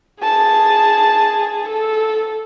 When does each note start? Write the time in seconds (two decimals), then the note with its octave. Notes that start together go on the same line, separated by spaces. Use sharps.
0.23 G#4 A5
1.69 A4